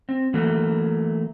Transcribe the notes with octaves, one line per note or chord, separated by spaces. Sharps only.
C4
E3 F#3 A3 A#3